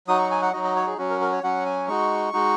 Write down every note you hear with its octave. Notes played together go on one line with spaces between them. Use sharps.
F#3 D#4 F#4 D#6
C#6
G#5
F#5
F#3 D#4 F#4 D#5
D#5
C#5
G#4
F#3 C#4 F#4
A#4
A#4
C#5
F#3 C#4 F#4 F#5
G#5
G#3 D#4 F#4 C#6
G#3 D#4 F#4